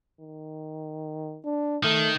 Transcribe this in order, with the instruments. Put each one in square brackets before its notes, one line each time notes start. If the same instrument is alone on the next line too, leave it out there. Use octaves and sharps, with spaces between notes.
[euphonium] D#3
D4
[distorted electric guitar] D#3 [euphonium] A3